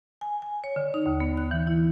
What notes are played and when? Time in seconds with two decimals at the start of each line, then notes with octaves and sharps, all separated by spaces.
0.21 G#5
0.42 G#5
0.64 C#5
0.76 D3
0.94 D#4
1.06 D#2
1.20 B3
1.37 F#6
1.51 E3
1.67 E4